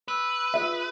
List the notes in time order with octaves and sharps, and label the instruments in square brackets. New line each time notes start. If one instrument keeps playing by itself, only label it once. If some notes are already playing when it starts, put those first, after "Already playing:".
[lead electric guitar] B4 [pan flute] E6
[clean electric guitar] F4 G#4 E5